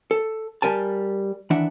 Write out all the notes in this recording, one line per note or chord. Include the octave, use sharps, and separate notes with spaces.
A4
G3 A#4 G#5 A5
D#3 E3 D4 E5 F#5